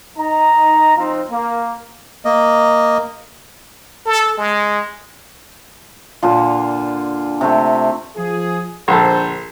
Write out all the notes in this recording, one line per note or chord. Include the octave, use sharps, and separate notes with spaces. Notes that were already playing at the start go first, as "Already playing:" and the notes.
D#4 A#5
F3 C4 D#4 F4
A#3
A#3 D#5
A4
G#3
A#2 D3 F4
C3 A3
F3 G#4
A#1 D3 A4 C5